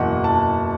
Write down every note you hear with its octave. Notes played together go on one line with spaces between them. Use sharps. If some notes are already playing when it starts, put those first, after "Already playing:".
Already playing: F#1 E2 B2 F#5
A5